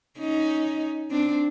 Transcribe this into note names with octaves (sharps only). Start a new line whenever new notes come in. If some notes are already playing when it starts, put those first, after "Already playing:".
C#4 D#4
C4 D4